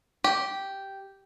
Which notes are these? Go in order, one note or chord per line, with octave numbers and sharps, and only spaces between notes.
G4